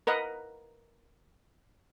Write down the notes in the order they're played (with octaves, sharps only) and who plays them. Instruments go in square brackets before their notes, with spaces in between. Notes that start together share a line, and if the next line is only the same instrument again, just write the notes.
[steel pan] A#4 B4 D#5 F#5